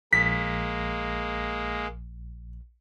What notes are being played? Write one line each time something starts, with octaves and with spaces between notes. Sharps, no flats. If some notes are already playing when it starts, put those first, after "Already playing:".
A#1 G#3 A#3 B6